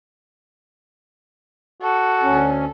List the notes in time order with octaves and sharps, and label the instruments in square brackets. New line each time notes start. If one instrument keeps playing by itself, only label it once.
[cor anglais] F#4 [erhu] A4
[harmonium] D2 C#4